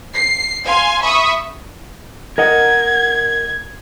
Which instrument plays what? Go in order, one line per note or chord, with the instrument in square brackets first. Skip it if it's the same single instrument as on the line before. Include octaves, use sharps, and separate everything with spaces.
[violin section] C7
F5 G#5 C6
E5 B5 C#6 D#6
[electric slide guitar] A#4 D#5 F#5 [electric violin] G#6